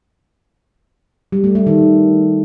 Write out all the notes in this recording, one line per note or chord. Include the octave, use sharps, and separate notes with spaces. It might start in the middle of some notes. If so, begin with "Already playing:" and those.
G3
A3
A3
D#3